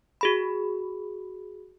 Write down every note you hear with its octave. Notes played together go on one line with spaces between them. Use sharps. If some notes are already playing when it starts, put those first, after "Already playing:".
F#4 G#4 B5